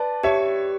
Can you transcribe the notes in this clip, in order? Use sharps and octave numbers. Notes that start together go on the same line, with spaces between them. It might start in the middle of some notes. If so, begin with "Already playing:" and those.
Already playing: B4 D5 A5
G4 C#5 E5